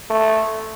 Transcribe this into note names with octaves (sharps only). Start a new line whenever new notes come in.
A3